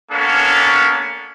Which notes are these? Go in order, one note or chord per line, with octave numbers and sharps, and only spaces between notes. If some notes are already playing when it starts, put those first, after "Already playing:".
A#3 B3 C#4 D4 A4